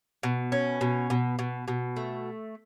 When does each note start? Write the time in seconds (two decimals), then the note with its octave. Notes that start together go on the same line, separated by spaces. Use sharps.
0.23 B2
0.52 C#4
0.81 B2
1.10 B2
1.39 B2
1.68 B2
1.97 A3